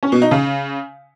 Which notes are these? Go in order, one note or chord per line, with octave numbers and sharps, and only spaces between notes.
C#4
B2
D#4
C#3